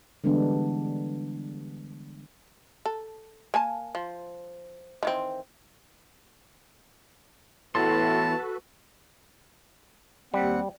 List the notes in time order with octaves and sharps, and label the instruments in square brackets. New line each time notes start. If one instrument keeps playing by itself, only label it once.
[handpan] D3 E3 G3 G#3 B3 D4
[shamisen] A4
A#3 G#5 A5
F3
D#3 E3 C4
[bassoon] A2 [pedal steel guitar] E3 B3 C6 [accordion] F#4 A4 B4 [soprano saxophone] A5
[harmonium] D#2 C4 F#5 [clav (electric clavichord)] G3